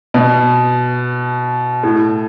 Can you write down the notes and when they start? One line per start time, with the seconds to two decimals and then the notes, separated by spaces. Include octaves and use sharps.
0.14 B2
1.83 A2